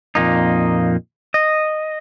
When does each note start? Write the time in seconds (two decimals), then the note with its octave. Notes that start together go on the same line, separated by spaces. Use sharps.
0.15 F2 A#2 A#3 D#4
1.34 D#5